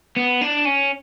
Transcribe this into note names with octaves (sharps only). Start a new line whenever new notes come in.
B3
D4
C#4